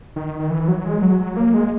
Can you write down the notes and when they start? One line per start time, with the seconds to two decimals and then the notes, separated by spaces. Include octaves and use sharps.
0.16 D#3
0.39 D#3
0.50 E3
0.68 F#3
0.85 G#3
1.02 F#3
1.19 F#3
1.37 A#3
1.54 G#3